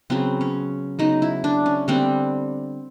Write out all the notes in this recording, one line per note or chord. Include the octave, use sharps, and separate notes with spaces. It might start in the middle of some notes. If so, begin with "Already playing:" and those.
C#3 F#3 B3 C4
C#4
C#3 F#3 B3 D#4
E4
D4
C#4
D3 G3 B3 C4